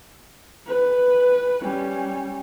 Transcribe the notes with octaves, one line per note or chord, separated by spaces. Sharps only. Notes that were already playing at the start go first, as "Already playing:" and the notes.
B4
G3 C#4